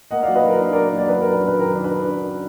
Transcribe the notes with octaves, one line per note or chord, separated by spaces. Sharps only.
A#3 D#5 F#5
F#3 D5 F5
B4 D#5
F#3 A#4
D4
A#3 A#4 D5
A#4
F#3 D5
F#2 B4
D4 A#4
B4
F#2
B4
D#3 A#4
D4
B4
D4